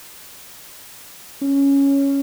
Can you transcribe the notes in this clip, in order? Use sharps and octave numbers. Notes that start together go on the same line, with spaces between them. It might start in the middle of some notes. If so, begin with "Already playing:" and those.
C#4